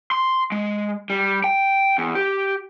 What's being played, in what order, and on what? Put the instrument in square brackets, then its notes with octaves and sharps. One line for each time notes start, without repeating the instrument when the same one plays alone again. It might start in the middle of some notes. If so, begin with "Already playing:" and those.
[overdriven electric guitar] C6
G#3
G3
G5
E2
G4